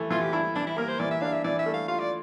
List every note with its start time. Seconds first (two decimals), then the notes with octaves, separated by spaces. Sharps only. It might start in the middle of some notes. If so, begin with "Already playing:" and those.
Already playing: E3 A3
0.11 E3 F4
0.22 G4
0.33 D4 E4
0.55 E3 D4
0.67 E4
0.77 A#3 A#4
0.88 C5
0.99 E3 D5
1.11 E5
1.21 D4 F5
1.32 E5
1.44 E3 D5
1.59 E5
1.66 A3
1.74 F5
1.88 F4 F5
1.99 D5